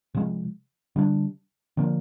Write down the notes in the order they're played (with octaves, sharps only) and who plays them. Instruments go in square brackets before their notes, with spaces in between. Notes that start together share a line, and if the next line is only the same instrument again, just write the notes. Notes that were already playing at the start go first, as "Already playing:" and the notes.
[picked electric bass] C3 F3 G#3
D3 G3 A#3 D4
D3 F3 A#3 D4